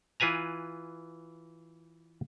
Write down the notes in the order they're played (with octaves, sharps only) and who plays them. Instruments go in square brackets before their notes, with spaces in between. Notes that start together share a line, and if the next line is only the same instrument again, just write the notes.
[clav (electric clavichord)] E3 F4 B4 G#5 A#5